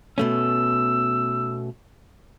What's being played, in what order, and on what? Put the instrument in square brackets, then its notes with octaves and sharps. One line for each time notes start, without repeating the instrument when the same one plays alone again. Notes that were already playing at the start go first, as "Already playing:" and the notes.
[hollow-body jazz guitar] B2 A3 C#4 [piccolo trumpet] E6